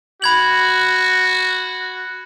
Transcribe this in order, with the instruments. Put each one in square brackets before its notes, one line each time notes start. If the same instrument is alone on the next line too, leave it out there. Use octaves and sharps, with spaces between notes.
[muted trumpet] F#4 [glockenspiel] B5 G#6 F#7